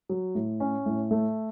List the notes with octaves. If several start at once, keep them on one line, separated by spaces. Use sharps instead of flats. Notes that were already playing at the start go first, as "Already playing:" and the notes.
F#3
A2
C#4
A2
A3